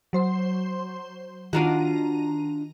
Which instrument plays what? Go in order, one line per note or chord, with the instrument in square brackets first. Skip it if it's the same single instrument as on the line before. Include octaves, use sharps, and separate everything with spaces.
[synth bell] F#3 C5 C6
[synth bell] D#3 A#5 D#7 [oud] D4 F4 F#4